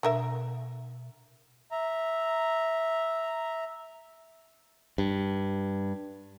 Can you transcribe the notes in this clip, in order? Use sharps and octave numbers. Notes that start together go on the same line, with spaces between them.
B2 D3 A#4 E5
E5 A#5
G2